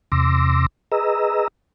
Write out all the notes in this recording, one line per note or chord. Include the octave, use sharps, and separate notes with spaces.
E2 C3 C6 D6 E6 A#6
G#4 B4 D#5 A#5 E6